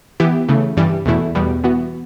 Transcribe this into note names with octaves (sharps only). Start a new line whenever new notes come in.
E3 B3 E4 G4
C#3 E3 A3
G2 E3 G3
E2 B2 A3 E4
E2 B2 G3 B3
E3 B3 F#4